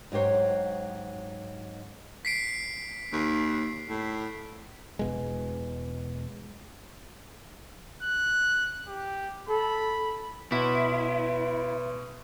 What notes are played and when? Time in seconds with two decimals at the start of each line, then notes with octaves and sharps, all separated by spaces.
0.12 G#2 F#3 G4 C5 C#5
2.25 B6 C7 D7
3.13 D#2
3.89 A2
4.99 E1 B2 G#3
8.03 F#6
8.88 G4
9.49 A4 B5
10.52 B2 E4 B4 C#5 C6